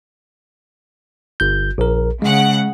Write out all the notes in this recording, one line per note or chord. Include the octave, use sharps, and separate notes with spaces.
G1 G6
A#1 A#4
C#3 G#3 F#5